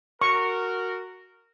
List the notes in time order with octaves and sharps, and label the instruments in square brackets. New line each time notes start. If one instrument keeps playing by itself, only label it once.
[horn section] F#4 A#4 [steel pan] C#6